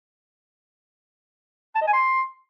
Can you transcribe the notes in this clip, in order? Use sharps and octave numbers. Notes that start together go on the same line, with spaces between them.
A5
D#5
G#5
C6